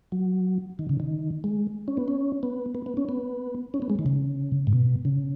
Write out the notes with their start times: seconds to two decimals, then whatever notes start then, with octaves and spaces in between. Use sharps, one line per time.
0.12 F#3
0.79 D#3
0.89 C#3
1.00 D#3
1.44 G#3
1.88 C#4
1.97 B3
2.08 C#4
2.43 B3
2.75 B3
2.86 B3
2.97 C#4
3.09 B3
3.74 C#4
3.82 B3
3.90 G#3
3.99 D#3
4.06 C#3
4.67 G#2
4.73 B2
5.05 C#3